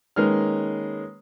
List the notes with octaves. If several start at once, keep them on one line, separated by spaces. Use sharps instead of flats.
D#3 G#3 A#3 C#4 B4 F6